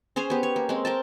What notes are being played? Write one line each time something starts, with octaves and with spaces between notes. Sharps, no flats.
C#4 G#4 C5 C#5
B3 G4
C#5
A#3
G#3 C4
A#4 G5 A5